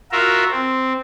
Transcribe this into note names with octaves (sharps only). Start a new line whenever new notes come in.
F4 F#4 A#4 E5
C4